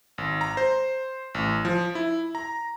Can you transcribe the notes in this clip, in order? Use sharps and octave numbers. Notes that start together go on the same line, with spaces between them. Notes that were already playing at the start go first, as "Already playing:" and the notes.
G#1
A#5
C5
A1
F3
E4
A#5